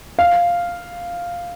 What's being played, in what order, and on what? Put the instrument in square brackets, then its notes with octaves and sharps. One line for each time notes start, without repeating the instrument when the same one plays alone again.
[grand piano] F5